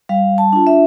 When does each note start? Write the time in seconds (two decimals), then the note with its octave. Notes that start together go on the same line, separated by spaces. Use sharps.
0.09 G3 F5
0.38 A5
0.53 D4 F4
0.67 E5